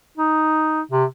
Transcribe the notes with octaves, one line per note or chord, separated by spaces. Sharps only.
D#4
C3